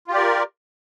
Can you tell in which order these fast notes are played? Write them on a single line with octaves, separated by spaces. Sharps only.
F4 G4 D5 A#4